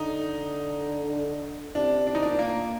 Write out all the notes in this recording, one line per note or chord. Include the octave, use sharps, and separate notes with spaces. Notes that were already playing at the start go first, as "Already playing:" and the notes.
Already playing: D3 D#4
C3 D4
D4
D#4
A#2 D4
A#3